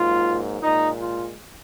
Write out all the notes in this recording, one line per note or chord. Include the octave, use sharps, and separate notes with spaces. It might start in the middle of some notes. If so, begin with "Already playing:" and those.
Already playing: G#2 F#3 A#3 F4
A#2 G#3 D#4
F4